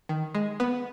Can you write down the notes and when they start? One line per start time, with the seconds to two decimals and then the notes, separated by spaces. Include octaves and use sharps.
0.09 D#3
0.35 G#3
0.60 B3